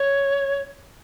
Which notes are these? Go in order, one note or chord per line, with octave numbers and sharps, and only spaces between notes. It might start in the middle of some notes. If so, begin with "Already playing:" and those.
Already playing: C#5